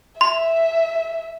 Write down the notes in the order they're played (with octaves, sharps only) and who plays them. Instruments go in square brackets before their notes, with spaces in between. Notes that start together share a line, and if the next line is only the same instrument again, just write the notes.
[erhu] E5 [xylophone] C6